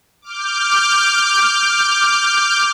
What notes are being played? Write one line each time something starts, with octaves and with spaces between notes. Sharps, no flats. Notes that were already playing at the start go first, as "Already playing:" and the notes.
D6 F6 G6